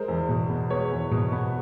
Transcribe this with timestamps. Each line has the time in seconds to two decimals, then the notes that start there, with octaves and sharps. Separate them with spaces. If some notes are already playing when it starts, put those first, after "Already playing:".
Already playing: G#3 A#4 C5
0.08 E2
0.29 B2
0.49 B3
0.70 G#3 B4 C#5
0.91 E2
1.11 B2
1.32 B3